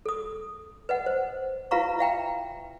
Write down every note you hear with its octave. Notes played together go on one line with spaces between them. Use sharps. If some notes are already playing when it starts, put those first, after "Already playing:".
A4 D#6
B4 D#5 F#5
C5
E4 F4 B4 F5 A#5 C#6
E5 F5 G5 A#5